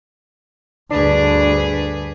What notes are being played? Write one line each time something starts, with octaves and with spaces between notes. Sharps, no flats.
D2 G2 D4 G#4 B4